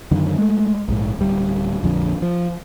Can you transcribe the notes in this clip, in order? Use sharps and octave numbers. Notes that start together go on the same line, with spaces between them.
F#2 D3 D#3
G#3 A3
A#1 G#2
D1 G3
A#1 F2 D3
F3